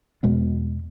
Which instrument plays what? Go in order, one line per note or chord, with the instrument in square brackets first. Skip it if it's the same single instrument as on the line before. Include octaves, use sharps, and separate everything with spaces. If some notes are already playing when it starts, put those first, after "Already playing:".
[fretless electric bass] E2 B2 G#3 B3